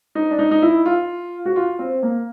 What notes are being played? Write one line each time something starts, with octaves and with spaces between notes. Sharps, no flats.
D#4
D4
D#4
D#4
E4
F4
F#4
F4
C4
A#3